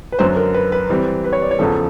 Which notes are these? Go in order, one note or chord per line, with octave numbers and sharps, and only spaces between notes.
B4
F#2 D3 F#3 C5
A#4
B4
B4
E3 G3 C4
B4
C#5
D5
C#5
E2 C#3 F3 A4